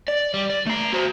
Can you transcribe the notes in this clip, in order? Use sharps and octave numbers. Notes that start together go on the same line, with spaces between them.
D5
G3
D5
A3 A#5
F#4 C5